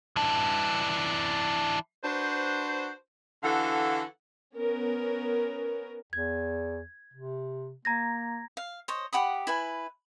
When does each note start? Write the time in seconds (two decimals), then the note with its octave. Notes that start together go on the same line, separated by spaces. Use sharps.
0.16 E3 D4
2.03 D4 F#4 B4 C5
3.43 D3 E3 F#4 A4 F5 F#5
4.55 B3 C#4 A#4
6.13 E2 G#6
7.14 C3
7.85 A#3 A#5 G#6 A#6
8.57 F5
8.88 C5 C#5 D#5
9.13 G4 F#5 B5 D#6
9.47 E4 B4 G#5